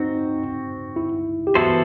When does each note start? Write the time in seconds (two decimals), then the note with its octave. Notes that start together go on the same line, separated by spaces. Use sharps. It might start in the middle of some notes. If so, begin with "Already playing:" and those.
Already playing: C4 D#4 F#4
0.96 E4
1.47 G4
1.55 E3 B3 E4 F#4 A4 C5